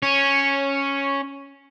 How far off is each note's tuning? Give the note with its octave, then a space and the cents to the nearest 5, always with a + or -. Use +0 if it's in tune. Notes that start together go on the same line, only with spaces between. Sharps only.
C#4 +0 C#5 -5